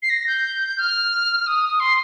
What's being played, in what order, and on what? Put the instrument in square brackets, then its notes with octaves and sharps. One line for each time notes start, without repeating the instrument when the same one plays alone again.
[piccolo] C7
A#6
G6
F6
F6
D#6
D#6
C6